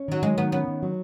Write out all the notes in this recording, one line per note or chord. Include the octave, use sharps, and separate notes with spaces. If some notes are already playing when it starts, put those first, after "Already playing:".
Already playing: C#4
D#3 F#3
F#3 G#3
D#3 B3
B3 C#4
D#3
F#3